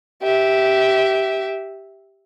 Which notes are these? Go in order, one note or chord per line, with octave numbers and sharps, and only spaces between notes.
G4 E5